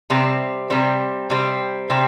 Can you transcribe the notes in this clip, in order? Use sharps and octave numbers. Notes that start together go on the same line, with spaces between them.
C3 G3 C4
C3 G3 C4
C3 G3 C4
C3 G3 C4